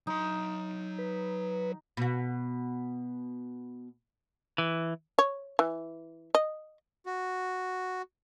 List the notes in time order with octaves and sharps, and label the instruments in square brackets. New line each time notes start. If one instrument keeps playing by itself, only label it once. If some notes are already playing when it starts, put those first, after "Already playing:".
[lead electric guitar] F#3 C6 [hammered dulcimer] D#4
[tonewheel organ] B4
[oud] B2 F#4
[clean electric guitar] E3
[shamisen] C#5
E3
D#5
[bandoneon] F#4